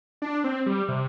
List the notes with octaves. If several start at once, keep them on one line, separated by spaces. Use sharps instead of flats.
D4
C4
G3
C3